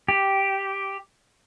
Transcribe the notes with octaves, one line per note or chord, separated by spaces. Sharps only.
G4